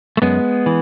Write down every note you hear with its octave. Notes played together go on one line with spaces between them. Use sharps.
A3
F#2 G#3 B3
E3